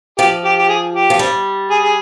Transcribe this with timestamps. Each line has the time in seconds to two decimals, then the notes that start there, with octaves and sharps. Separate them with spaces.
0.18 F3 G4
0.44 G4
0.58 G4
0.69 G#4
0.94 G4
1.10 F3
1.19 G3
1.70 G#4
1.83 G#4